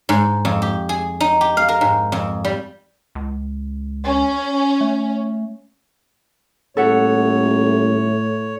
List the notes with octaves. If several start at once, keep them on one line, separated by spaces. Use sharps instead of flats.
G#2
F2
G4
G#4
D#4
G4
F5
A#4
G#2
F2
G3
C#2
C#4
A3
D#1 A2 A4 C#5 E5 F#5